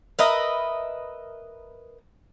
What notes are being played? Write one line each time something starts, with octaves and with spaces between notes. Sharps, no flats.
A#4 B4 D#5 E5